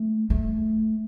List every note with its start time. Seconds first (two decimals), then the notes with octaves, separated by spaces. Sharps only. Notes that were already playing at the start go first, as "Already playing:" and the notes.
Already playing: A3
0.30 A3